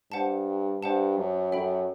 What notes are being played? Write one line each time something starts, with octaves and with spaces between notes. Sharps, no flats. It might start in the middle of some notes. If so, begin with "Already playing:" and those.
G2 C5 F#5 A5
G2 C5 F#5 A5
F#2
F#2 A4 E5 G5 B5